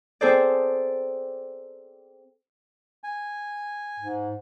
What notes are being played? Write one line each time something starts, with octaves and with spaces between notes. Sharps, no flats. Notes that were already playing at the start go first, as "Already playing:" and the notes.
C4 G#4 A4 C5 D5
G#5
G#2